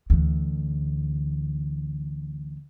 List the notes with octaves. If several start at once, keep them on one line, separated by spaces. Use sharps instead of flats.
D2 E3